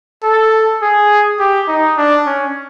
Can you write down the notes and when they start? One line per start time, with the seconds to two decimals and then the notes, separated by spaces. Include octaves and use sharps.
0.23 A4
0.82 G#4
1.40 G4
1.68 D#4
1.97 D4
2.26 C#4